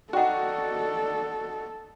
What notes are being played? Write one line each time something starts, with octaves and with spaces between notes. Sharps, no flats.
D#4 F#4 A4 D5 F#5 G5 C6